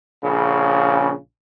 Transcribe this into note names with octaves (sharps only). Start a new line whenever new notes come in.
A#1 C#3